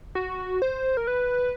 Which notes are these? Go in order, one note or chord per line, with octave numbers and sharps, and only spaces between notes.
F#4
C5
A#4
B4